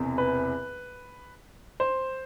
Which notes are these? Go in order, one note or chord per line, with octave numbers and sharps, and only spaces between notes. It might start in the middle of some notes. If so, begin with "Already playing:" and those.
Already playing: E1 E2 C3
B4
C5